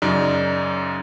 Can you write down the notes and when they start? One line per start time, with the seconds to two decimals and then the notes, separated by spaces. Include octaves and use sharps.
0.02 F#2 C#3 D#4 D5